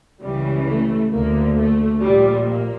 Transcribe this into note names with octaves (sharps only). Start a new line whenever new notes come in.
C#2 C#3 E3 G3
A3
D2 D3 A#3
A3
A#1 A#2 G3
A#3